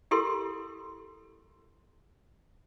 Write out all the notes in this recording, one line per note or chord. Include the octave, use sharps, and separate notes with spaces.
E4 G4 A4 A#4 C6